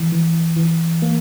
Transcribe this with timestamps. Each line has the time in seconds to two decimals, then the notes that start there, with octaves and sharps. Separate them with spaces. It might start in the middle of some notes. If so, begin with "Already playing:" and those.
Already playing: E3
0.12 E3
0.56 E3
1.02 A#3